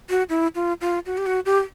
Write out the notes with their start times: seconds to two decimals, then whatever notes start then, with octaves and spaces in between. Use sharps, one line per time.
0.10 F#4
0.29 E4
0.55 F4
0.81 F4
1.06 F#4
1.18 G4
1.26 F#4
1.46 G4